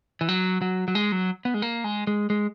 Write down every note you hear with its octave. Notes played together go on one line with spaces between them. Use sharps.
E3
F#3
F#3
F#3
G#3
F#3
B3
G#3
A#3
G#3
G#3
G#3